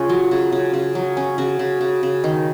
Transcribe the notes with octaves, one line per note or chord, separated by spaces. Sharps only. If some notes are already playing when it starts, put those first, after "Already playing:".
Already playing: C#3 C#4 F4
F#3
C#3
C#3
C#3
F#3
C#4
C#3 F#4
C#3
C#3
C#3
D#3